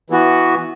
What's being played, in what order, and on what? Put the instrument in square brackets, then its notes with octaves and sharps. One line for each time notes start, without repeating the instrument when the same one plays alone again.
[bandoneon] E3 B3 F#4